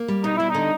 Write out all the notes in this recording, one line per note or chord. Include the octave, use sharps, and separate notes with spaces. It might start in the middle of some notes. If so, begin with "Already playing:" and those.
Already playing: A#3
G3
B2 D#4
G3 E4
D3 D#4